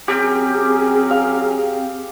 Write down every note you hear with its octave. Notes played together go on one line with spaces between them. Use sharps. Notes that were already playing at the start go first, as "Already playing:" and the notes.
F#3 C4 C#4 G4 G#4 A#4
F5